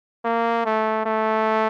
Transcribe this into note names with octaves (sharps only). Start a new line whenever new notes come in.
A#3
A3
A3